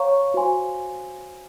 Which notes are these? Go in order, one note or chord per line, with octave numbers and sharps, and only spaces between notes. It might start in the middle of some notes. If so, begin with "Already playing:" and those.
Already playing: C#5 F5 A#5 C#6
F#4 C5 F5 G#5 C6